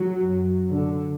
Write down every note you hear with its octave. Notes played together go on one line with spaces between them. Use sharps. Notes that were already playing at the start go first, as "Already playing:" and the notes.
Already playing: F#3
F#2
D3